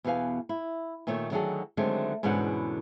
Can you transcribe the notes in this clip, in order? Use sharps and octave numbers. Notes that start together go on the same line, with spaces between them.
E2 B2 G4 B4 F5 G#5
E4
A#2 D#3 A3 C#5
D3 D#3 F#3 F#4 G#4 A4
D3 D#3 F#3 G#3 A3 C4
E2 G#2 B2 D3 C#4 F#5